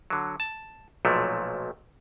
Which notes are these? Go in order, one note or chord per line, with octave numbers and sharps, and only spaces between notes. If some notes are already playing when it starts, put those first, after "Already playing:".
D3 F#3
A5
B1 A#2 F3 F#3 A3